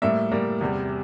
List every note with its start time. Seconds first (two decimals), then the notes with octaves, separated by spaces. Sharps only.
0.02 A2 G3 A#3 E5
0.31 A2 G3 A#3
0.61 E2 C3 G3